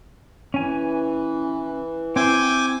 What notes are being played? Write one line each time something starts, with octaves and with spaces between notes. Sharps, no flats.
E3 C#4 G#5
C4 E4 C5 G5 G#5 D6